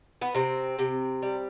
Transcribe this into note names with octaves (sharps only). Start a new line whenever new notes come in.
B3
C3 C4
C3
G3